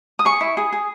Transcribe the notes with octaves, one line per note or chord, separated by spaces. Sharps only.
D#6
G#4 C#6
E4
G#4
G#4